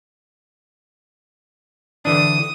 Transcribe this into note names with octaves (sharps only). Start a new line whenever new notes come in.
D3 E3 D4 D#6